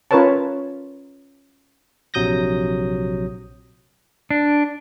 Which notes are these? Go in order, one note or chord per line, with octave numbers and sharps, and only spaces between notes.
C#4 F4 A#4 B4 C#5 A5
A#1 C3 F#3 D#6 G6 A#6
D4